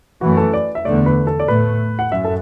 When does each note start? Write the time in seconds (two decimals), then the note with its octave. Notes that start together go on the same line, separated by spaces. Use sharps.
0.21 F#2 E3 A3 F#4
0.37 A4
0.53 D5
0.75 E5
0.85 E2 D3 A3 D5
1.06 B4
1.27 A4
1.40 D5
1.48 A2 A3 B4
1.99 F#5
2.11 F#2 E5
2.24 A4